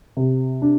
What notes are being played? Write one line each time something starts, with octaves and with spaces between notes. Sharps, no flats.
C3
D4